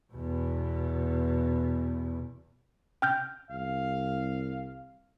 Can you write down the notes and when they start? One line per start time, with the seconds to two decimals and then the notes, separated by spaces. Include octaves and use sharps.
0.13 E2 B2
3.02 G5 F6 G6
3.50 C2 F5